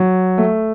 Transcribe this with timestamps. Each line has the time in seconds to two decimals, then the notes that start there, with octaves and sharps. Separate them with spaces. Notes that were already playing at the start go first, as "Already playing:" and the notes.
Already playing: F#3
0.38 A3